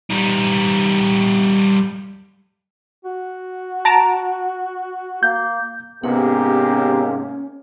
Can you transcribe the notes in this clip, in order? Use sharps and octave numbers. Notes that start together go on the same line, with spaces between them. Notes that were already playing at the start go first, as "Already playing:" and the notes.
G3 D#4
F#4
A5 A#5 D7
A#3 G6
G#2 C3 A#3 B3 C#4 G4